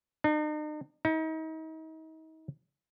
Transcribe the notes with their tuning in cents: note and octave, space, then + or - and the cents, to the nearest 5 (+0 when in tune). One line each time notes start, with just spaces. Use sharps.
D#4 -45
D#4 +35